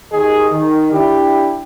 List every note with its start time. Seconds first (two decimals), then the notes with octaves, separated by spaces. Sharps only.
0.12 D#2 D#3 G#4 D#5
0.52 D#3
0.92 D4 E4 G4